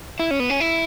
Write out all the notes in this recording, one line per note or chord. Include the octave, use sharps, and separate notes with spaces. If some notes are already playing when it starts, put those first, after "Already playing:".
E4
C#4
B3
C#4
E4